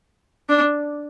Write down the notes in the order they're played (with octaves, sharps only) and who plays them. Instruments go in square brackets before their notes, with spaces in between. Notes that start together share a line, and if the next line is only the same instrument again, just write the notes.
[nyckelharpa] D4